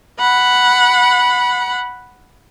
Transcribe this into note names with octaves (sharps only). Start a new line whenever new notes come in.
F#5 B5